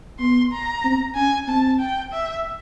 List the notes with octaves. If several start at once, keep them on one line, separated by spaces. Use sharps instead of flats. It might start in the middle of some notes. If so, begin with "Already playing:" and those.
B3 C6
A#5
C4
C#4 G#5
C4 A5
G5
E5